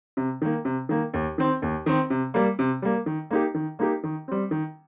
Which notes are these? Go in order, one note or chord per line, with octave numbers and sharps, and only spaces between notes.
C3
D#3 A#3
C3
D#3 A#3
D#2
D#3 C4
D#2
D#3 C4
C3
G3 A#3
C3
G3 A#3
D#3
A#3 D#4 G4
D#3
A#3 D#4 G4
D#3
G3 C4
D#3